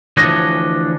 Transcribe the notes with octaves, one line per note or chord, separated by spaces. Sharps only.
D2 E3 F3 D4 C#5 D#5